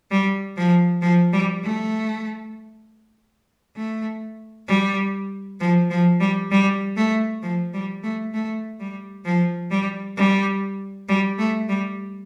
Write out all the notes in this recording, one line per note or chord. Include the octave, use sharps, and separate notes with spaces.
G3
F3
F3
G3
A3
A3
G3
F3
F3
G3
G3
A3
F3
G3
A3
A3
G3
F3
G3
G3
G3
A3
G3